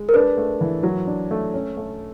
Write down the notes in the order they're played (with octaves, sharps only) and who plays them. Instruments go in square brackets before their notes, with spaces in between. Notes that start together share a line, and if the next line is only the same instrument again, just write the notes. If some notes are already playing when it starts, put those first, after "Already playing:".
Already playing: [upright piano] G#3
[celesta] A#4
[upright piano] D4 [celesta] B4
[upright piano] A3
E3
F#3
D4
A3
C#4
A3